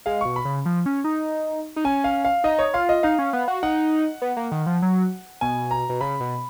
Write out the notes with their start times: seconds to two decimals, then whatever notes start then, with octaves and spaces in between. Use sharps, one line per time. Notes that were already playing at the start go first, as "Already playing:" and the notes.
0.06 G#3 F5
0.21 B2 C#6
0.36 B5
0.45 C#3
0.66 F3
0.86 C#4
1.04 D#4
1.76 D#4
1.85 C#4 G#5
2.04 F5
2.25 F5
2.44 D#4 D#5
2.59 C#5
2.74 F4 F5
2.89 D#5
3.03 D#4 F5
3.19 C#4
3.33 B3
3.48 F#4
3.63 D#4 F#5
4.22 B3
4.36 A#3
4.52 D#3
4.66 F3
4.82 F#3
5.41 B2 G#5
5.71 A#5
5.89 B2
6.01 C#3 B5
6.20 B2